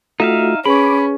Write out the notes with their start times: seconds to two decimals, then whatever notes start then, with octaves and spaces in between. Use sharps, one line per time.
0.20 A3 D#4 F4 F#4 E5 F5
0.66 C#4 G#4 B4 B5 C#6 D6